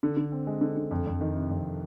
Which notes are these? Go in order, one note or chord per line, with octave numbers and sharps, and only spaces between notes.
D3
D3
C4
G#3
D3
D3
F2
F2
D#3
C3
F2